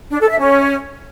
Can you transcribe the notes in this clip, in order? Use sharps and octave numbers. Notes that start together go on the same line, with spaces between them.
D4
A4
E5
C#4